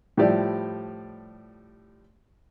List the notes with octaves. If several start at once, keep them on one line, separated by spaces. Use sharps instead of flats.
A2 F3 G3 E4 G4 D5